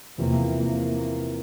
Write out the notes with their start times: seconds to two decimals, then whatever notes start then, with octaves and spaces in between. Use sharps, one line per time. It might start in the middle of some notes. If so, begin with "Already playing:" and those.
0.18 E2 C3 F3 A#3 C4 E4
0.52 A#3